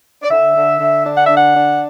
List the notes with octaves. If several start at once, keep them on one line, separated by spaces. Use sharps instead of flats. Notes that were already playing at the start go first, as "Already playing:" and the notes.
D5
D3 E5
D3
D3
D4
F#5
D3 E5
F#5
D4